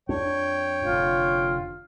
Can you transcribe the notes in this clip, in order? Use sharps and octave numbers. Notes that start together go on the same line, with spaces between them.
F2 D4 C#5 G5
F1 D3 F4